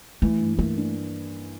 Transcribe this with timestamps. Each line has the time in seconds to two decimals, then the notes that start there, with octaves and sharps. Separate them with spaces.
0.22 E3 A3
0.40 G2
0.59 A3 A#3
0.77 D4